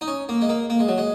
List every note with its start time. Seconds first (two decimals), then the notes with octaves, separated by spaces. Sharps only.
0.01 D#4
0.07 C#4
0.29 A#3
0.41 G#3
0.49 A#3
0.70 A#3
0.79 G#3
0.88 F#3
0.98 G#3